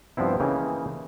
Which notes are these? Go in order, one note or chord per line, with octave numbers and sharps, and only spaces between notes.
G2 F3 B3 C4 E4
C#3 E3 A#3 D#4 G5